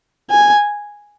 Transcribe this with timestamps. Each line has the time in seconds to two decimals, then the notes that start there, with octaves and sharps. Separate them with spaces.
0.30 G#5